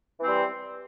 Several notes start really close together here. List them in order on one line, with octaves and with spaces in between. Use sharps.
E3 C4 G3